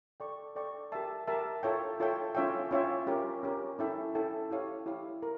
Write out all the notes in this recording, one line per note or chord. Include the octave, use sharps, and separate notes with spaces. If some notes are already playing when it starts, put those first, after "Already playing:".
A4 D5 G5 C#6
A4 D5 G5 C#6
G4 A#4 E5 A5
G4 A#4 E5 A5
F4 A4 C#5 E5 G5
F4 A4 C#5 E5 G5
C#4 F4 C#5 E5 G5
C#4 F4 C#5 E5 G5
C#4 G4 A#4
C#4 G4 A#4
C#4 E4 A4 E5 G5
C#4 E4 A4 E5 G5
E4 G4 C#5 F5
E4 G4 C#5 F5
A#4